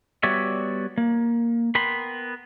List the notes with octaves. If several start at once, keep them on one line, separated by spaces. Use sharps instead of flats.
G3 B3 F#4 C#5 D5 E5
A#3
B3 A#4 G5 B5 C6